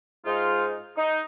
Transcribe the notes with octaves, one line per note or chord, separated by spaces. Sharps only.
G#2 G#3 D#4 F4
D#4